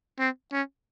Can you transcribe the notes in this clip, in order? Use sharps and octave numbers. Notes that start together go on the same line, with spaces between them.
C4
C#4